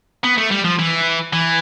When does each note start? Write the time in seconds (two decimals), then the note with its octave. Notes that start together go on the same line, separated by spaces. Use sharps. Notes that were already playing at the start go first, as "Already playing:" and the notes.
0.24 B3
0.38 A3
0.51 G3
0.65 F3
0.79 E3
1.33 E3